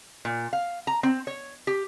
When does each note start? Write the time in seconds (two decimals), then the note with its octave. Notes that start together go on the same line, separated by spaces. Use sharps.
0.25 A#2
0.53 F5
0.87 A#5
1.03 C4
1.27 C#5
1.67 G4